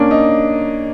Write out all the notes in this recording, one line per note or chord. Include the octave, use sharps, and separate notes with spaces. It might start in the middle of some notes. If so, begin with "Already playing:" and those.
Already playing: A#3 C#4 D4
D#4